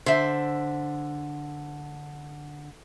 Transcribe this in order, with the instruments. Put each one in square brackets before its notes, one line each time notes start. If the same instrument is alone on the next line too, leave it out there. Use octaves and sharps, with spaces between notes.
[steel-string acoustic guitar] D3 [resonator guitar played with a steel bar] C5 E5